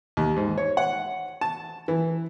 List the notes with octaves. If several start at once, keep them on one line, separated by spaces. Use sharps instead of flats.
D#2
G#2
C#5
F#5
A5
E3